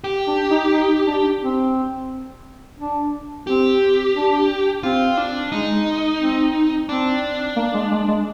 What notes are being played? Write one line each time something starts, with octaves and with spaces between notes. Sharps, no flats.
G4
D4
D#4
D#4
D4
C4
D4
C4 G4
D4
C4 F4
D4
G#3 D#4
C4
C4 D4
A#3
G#3
G#3
G#3